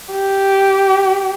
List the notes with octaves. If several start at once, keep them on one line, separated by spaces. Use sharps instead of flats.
G4